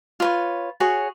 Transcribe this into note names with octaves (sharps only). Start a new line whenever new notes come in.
F4 B4 C#5
F#4 G#4 C#5